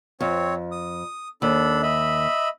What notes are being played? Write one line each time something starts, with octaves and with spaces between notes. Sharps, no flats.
F2 C4 C#5
D#6
D#2 D4 A4 B5
D#5 E5 B5